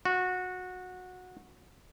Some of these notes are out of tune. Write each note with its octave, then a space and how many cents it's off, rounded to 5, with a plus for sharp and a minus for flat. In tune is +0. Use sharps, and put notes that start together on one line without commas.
F#4 -20